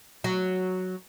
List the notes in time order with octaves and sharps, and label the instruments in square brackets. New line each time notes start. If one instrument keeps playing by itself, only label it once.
[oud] F#3